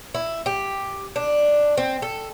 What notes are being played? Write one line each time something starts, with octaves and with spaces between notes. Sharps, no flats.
E4
G4
D4
C4
A4